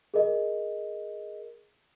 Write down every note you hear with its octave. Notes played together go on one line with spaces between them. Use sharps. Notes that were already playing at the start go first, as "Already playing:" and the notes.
G#4 A#4 D#5